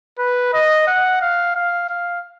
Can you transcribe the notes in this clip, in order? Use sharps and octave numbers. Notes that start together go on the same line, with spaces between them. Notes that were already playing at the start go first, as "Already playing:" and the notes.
B4
D#5
F#5
F5
F5
F5